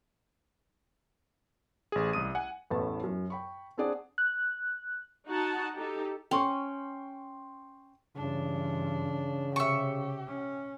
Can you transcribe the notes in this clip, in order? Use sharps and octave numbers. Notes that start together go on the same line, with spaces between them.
A1 G#4
C2 D#6 D#7
F#5 G#5
A1 E2 A2 E3 A3 A5
F#2
G5 B5 C#6
C4 D4 G#4 D5 F#5
F#6
D#4 F#4 F#5 A5
D#4 G4 A4
C#4 G5 C6 C#6
G2 C#3 E3 D4
C3 G4 E5 C#6
C#4